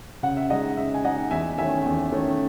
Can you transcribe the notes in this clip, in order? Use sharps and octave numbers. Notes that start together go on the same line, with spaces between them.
C#3 F#5
E5
G#3 D#4 D#5 F#5
C#3 E5
G#5
G#3 D#4 D#5 F#5
E2 E5 G#5
D#3 A3 C#4 E5 G#5
E2
D#3 A3 C#4